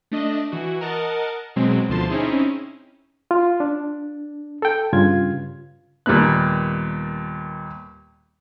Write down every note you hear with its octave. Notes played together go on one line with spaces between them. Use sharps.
A3 D4 D#5
E3 F#4
A#4 D#5 F#5 A5
B2 F#3 G#3 C4
D2 B2 D3 F3 A5 C6
C4 C#4 D#4 E4 G#4
F4
D4
A4 G5
G2 C#3 F4 G#6
D#2 A#2 G3 A#3 B3 F#6